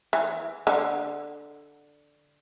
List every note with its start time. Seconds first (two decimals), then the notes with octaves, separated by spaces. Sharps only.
0.13 E3
0.67 D3